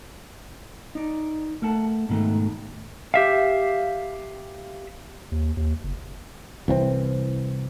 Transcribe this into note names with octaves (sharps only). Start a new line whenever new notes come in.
D#4 D5
A3 A#4 F#5 A5
G#2 B2 D#3 A3
G4 E5 F5
D#2
D#2
F#1
C2 E3 F3 C4